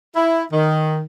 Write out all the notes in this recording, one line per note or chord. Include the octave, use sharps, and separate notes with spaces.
E4
D#3